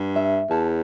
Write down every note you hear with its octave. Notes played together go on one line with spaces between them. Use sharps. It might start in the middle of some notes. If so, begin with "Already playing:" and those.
Already playing: G2
E5
E2 A5